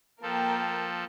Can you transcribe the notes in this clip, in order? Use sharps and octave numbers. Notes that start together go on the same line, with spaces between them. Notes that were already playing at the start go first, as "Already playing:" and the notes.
F3 A#3 A4 A#4 G5